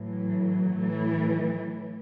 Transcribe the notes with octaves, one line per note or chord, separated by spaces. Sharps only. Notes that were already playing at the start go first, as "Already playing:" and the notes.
Already playing: A2 E3 F#3
A2 E3